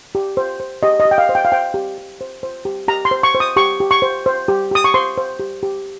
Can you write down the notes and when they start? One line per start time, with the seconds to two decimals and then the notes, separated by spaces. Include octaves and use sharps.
0.15 G4
0.37 C5
0.60 C5
0.83 G4 D#5
1.00 D#5
1.05 G4
1.11 G5
1.18 F5
1.29 C5
1.35 G5
1.45 F5
1.52 C5 G5
1.74 G4
1.98 G4
2.21 C5
2.43 C5
2.65 G4
2.88 G4 A#5
3.05 C6
3.11 C5
3.23 C#6
3.35 C5
3.40 D#6
3.56 G4 C#6
3.80 G4
3.91 C#6
4.02 C5
4.26 C5
4.48 G4
4.71 G4 D#6
4.84 C#6
4.94 C5 C6
5.17 C5
5.39 G4
5.63 G4